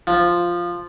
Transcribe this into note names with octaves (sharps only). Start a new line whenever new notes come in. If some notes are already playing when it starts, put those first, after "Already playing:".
F3